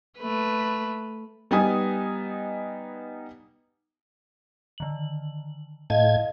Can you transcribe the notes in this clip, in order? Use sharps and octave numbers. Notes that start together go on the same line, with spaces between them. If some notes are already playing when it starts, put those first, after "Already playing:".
A3 B4
G3 B3 D#4 B4 G#5 D#6
D3 D#3 F#7
A2 D#5 F5 A5 G#6